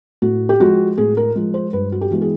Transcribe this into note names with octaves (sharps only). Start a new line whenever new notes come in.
A2 F#4
G4
F3 G#3 F#4
A2 G#4
A#4
F3 G#3
C5
G2 B4
F#4
G4
E3 G#3 B3 F#4
G#4